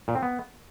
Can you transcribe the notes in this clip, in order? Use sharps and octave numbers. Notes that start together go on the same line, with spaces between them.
A#2
C4
B3